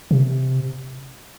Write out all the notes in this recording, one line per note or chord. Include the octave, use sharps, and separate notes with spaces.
C3